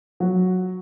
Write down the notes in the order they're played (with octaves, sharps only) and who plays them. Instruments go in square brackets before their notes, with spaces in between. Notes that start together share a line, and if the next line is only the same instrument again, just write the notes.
[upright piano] F#3